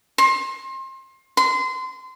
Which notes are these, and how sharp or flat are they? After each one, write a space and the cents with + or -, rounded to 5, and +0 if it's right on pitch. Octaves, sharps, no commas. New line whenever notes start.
C6 +30
C6 -25